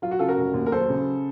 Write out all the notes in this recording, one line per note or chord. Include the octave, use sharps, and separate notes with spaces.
F#3 F4
F#4
C#3 F4 A4
F#4 A#4
F1
D#2
A#4
F#3 A4 C5
C#3